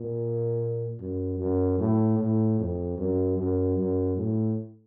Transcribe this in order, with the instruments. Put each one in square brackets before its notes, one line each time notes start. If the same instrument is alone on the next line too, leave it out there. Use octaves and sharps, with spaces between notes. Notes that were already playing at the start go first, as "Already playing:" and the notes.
Already playing: [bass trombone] A#2
F#2
F#2
A2
A2
F2
F#2
F#2
F#2
A2